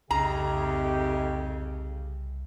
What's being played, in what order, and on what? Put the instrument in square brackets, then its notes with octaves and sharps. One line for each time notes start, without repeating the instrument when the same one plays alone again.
[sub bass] C2 [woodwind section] F2 C#3 [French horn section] A3 D#4 G4 [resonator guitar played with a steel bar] A#5